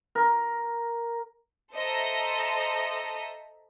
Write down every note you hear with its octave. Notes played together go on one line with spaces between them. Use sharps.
A#4
A4 C5 D#5 E5 A#5